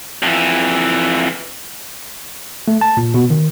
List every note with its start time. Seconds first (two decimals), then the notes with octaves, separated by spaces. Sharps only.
0.23 F2 E3
2.68 A3
2.81 A5
2.97 A#2
3.14 B2
3.30 D#3